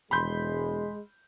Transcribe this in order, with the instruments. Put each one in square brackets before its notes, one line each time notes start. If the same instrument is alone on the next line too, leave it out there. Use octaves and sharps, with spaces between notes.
[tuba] E1 [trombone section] G#3 [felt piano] B5 C6 G6